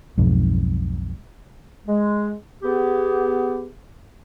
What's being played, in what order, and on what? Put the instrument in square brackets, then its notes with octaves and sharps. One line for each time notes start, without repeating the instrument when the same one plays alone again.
[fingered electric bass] B1 F2 G#2
[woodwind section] G#3
B3 G4 G#4